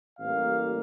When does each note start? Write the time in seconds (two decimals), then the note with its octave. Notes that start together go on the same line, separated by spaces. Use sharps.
0.17 A1 A2 G3 A#3 F5